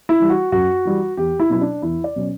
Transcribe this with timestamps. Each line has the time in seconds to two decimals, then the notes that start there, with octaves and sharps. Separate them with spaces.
0.09 E4
0.20 E3 G3
0.30 F#4
0.52 F#2 F#4
0.85 E3 G3
1.17 E2 G4
1.40 E4
1.50 B2 F#3 C#4 E4
1.61 D4
1.82 E2 E4
2.04 D5
2.16 B2 F#3 C#4